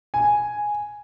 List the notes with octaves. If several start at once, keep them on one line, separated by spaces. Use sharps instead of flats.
G#5